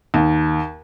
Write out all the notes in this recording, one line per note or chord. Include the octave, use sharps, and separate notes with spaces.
D#2